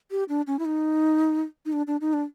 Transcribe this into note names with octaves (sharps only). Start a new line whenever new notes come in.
G4
D4
C#4
E4
D#4
D#4
D4
D4
D#4
D4